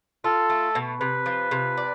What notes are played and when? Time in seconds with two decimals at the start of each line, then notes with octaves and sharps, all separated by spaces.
0.24 F4 A4
0.50 A3
0.75 B2
1.00 C3 B4
1.26 F3
1.51 C3
1.77 D5